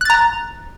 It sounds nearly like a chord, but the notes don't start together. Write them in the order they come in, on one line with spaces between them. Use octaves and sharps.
F#6 A6 A#5